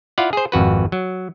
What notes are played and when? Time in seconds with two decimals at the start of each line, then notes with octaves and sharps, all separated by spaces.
0.18 E4 F4 D5 F5 F#5
0.33 G#4 C5
0.52 G#1 F2 F#4 B4
0.92 F#3